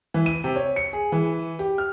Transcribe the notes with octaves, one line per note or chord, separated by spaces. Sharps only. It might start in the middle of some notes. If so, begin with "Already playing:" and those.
E3
D#7
C3
C#5
C#7
G#4
E3
G4
F6